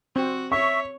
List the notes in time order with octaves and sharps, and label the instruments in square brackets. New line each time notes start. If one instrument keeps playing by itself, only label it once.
[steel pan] C4 [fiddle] F#4
[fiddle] C#5 [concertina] E5 [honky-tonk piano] C#6